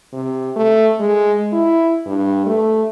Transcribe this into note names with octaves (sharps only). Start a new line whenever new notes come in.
C3
A3
G#3
E4
G2
A3